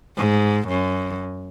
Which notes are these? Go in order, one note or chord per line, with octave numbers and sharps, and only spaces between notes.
G#2
F#2